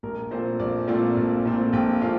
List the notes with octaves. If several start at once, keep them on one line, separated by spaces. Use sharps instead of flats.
A#1 A#4
A#2 A3 C4 F4 C5
A#1 D5
A#2 A3 C4 F4 D5
A#1
A#2 A3 C4 F4
A#1 G5
A#2 A3 C4 F4 F5